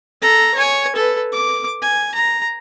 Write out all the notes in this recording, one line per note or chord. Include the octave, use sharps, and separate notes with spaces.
A4 A#5
C#5 G#5
A4 B4
D6
G#5
A#5